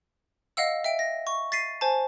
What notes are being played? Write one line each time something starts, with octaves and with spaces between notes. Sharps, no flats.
D#5 F5 F#5 E6
E5 G5 D7
A#6
C#6
A6 B6 C7 D#7
C5 G#5 A5